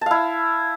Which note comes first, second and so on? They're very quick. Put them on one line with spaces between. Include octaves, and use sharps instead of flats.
A5 F5 E4